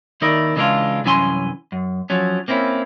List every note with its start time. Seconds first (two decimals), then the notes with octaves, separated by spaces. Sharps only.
0.21 D#2 D#3 D#4 E4 A#4 D5
0.56 C#3 E3 G#3 C#4 D4 F4
1.04 C2 F#2 E3 C#4 G#5 C6
1.72 F#2
2.10 F3 F#3 C#4
2.48 A#3 C4 C#4 E4